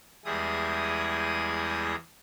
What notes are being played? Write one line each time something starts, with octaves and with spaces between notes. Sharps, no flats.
E2 G3 G#3 E4 G#4 D#6